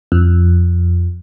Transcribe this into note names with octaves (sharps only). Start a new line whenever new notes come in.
F2